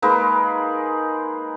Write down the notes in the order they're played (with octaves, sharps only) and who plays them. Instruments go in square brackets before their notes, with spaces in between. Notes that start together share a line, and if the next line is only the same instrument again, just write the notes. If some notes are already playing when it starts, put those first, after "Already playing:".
[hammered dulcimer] G#3 A#3 D#4 B4